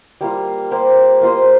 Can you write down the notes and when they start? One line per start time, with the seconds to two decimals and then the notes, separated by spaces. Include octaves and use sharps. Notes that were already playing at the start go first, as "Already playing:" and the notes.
0.21 G3 A#3 F4
0.71 A#3 G4 C5
1.21 A#3 F4 C5 D#5